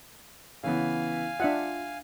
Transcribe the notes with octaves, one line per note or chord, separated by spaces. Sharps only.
C#3 E3 B3 F5 G#5
D4 F4 E5 F#5